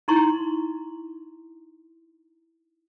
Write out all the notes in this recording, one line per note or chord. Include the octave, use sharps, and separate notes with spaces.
D#4 E4 A#5 C6 C#6